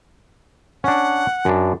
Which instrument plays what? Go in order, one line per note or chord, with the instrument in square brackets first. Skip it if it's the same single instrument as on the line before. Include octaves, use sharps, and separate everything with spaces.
[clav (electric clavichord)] C#4 D4 [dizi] F#5
[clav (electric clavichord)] F#2 D4